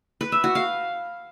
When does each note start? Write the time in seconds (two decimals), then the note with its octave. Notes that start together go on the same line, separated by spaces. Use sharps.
0.21 B4
0.32 E5
0.44 F#4
0.55 F5